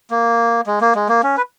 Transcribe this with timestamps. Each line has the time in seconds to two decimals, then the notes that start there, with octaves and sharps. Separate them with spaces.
0.10 A#3
0.67 G#3
0.81 A#3
0.95 G#3
1.09 A#3
1.23 C#4
1.37 B4